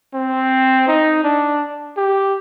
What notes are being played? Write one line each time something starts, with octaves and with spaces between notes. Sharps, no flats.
C4
D#4
D4
G4